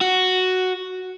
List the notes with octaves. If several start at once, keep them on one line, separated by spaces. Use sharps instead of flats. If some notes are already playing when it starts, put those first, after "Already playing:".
F#4